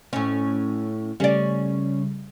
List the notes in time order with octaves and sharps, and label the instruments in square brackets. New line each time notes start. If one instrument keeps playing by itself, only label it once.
[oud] A2 C#4
[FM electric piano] C#3 G3 A3 [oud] C#4 D5